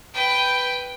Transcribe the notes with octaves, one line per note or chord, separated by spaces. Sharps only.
B4 G5